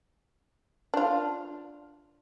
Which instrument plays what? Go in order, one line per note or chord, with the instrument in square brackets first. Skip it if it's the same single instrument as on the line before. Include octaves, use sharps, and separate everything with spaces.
[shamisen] D4 F4